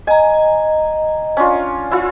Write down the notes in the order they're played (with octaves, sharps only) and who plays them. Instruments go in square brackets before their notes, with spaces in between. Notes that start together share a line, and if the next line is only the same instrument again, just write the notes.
[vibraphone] D#5 A#5 [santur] G#5
[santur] C#4 D4 F4
E4 F4